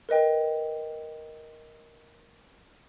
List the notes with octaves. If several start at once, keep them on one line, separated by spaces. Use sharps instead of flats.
A#4 B4 D#5 G5